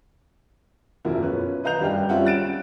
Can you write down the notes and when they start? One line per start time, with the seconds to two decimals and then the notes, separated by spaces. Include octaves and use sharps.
1.05 E1 F#2 F3 A#3 E4
1.23 C#4 F4 B4
1.64 B4 D#5 F5 A#5 G6 F7
1.80 F#2 G3 D4 F5 G5
2.09 G3 C4 C#4 F4 E5 F#5
2.25 F#6 A6 D7 E7